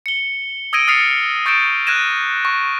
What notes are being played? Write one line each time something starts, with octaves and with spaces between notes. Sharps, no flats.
C#7 G7
D#6 E6 G#6 A#6 D7 D#7
D#6 F6 A6 C7 C#7 F7
C#6 G6 A6 C#7 D7 E7
F6 F#6 G#6 A#6 D#7 E7
C#6